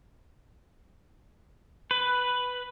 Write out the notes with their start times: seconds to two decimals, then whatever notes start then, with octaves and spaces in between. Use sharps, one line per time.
1.91 B4